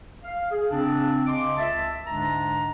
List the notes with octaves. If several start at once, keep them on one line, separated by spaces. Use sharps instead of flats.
F5
G#4
C#3 C4 D4
C#3 D#5 C6 D6
C#2 E5 A5
G#2 D3 G#3 D4 A#5